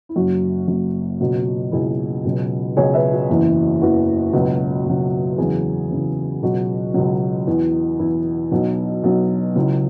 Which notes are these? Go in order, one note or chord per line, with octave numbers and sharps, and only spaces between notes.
E4
F#1 F#2 F#3 F#4
F#1 F#2 F#3 F#4
C#2 B2 F#3
C#2 B2 F#3 E4 G#4
C#2 B2 F#3
C#2 B2 F#3 G#4 C#5
B4 E5
F#4
F#1 E2 E3
F#1 E2 E3 F#4 B4
C#2 B2 F#3 F#4 B4
C#2 B2 F#3
E2 C#3 F#3 E4 G#4
E2 C#3 F#3
C#2 B2 F#3 F#4
C#2 B2 F#3 F#4
E2 E3
E2 E3 E4
B1 B2 F#3
B1 B2 F#3
C#2 C#3 F#3 E4